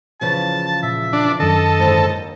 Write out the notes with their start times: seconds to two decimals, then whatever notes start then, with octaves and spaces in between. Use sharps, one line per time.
0.21 E2 C#3 F3 A5
0.83 A#2 E5
1.13 D4
1.40 F#2 D#3 A4 D#5
1.80 G#2 D3
2.09 D#2